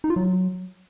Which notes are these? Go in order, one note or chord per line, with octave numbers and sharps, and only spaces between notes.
D#4
F4
F#3